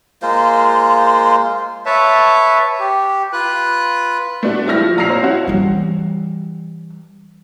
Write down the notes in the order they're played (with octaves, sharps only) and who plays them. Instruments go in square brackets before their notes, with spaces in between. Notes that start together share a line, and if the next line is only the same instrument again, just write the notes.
[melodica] G#3 A#3 F4 C5
[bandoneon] B4 C#5 E5 A5
G4
F4 B4 F#6
[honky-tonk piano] A3 B3 D4 F#4
G3 C4 E4 G4 F6 A#6
F3
A#1 A#5 E6 A#6 C7 F7
C5 C#5
C#4 E4 F#4 F#5
[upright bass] E3 G3